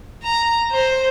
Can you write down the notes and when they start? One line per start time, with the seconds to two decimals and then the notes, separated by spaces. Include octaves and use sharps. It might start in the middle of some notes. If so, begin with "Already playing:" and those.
0.23 A#5
0.72 C5